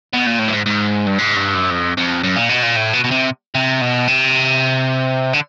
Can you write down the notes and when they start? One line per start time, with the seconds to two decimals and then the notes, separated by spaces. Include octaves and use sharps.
0.14 B2
0.27 A#2
0.39 A2
0.48 G2
0.53 G#2
0.66 G#2
1.07 G2
1.18 G#2
1.36 G2
1.54 F#2
1.71 F2
1.97 F2
2.23 F#2
2.36 A#2
2.49 B2
2.63 A#2
2.76 A2
2.93 B2
3.04 B2
3.11 C3
3.55 C3
3.81 B2
4.08 C3
5.33 D3